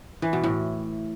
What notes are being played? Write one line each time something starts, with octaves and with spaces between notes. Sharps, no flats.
E3
B2
A2